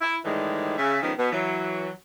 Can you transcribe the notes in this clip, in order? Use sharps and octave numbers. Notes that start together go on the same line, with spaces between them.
E4
A2 D#3 E3 G3 G#3
C#3 E5
G2 D#3 F3 G#3 B3 C#4
B2 B3
E3 F#3